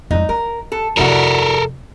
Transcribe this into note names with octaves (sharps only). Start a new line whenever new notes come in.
F2 G#3 D#4
E3 A#4
A4
F2 C3 G3 E4 F#4 A4 A#4